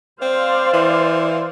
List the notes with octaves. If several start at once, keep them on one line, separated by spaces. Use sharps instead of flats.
C4 C5 D5 F5
E3